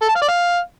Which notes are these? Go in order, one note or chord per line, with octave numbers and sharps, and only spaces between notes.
A4
A5
F5
D5
F5